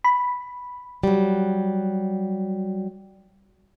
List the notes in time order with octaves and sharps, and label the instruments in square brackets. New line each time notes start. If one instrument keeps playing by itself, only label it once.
[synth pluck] B5
[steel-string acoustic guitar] F#3 G3